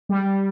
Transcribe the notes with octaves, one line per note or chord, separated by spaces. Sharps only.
G3